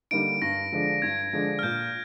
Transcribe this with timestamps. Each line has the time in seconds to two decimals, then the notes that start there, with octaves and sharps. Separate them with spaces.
0.11 D3 G3 A#3 D#4 D7
0.42 G2 A#6
0.72 D3 F3 G#3 D4
1.02 G2 G#6
1.33 D3 F3 G#3 D4
1.59 F6
1.63 A#2 G6